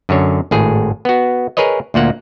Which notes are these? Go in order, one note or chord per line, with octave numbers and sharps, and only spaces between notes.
F#2 D3 C#5
G#1 A2 G#4
B3 F#4
G#4 A#4 B4 C#5 D#5
D2 A#2 A#3 F#5